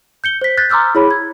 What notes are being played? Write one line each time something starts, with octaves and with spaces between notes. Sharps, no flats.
G6 C#7 G7
C5 B6
F#6 G6 A6 B6
A#5 C6 D6 E6 F6 G6
E4 G#4 C#5 B5
G#6